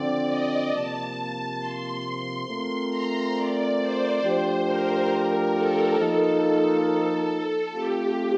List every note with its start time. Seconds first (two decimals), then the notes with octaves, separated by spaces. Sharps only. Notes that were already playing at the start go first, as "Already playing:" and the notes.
Already playing: D3 F3 C4 D5
0.27 D#5
0.71 C3 F3 A#3 A5
1.59 C6
2.47 A3 C4 F4 A#4
2.90 A#5
3.35 D5
3.79 C5
4.22 F3 A3 D4 G4
4.66 A#4
5.10 A#4
5.54 A4
5.97 F3 A#3 D#4 A4
7.73 A3 C4 F4 G4